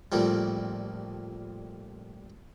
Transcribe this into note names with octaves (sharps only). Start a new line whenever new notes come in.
A1 A#2 F3 G3